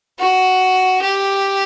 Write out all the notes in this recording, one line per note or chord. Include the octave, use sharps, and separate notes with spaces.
F#4
G4